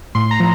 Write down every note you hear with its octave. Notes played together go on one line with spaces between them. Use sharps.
A2 C6
A#5
F3